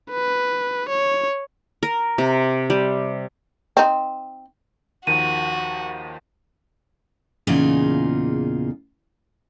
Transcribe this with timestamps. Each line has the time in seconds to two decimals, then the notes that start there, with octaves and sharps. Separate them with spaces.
0.11 B4
0.89 C#5
1.83 A#4
2.18 C3
2.70 G3
3.77 C4 D#4
5.07 D#2 D#3 F3 F#4 D#7
7.47 E2 A#2 C#3 D#4 F4 G#4